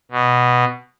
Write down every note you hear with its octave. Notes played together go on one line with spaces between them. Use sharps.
B2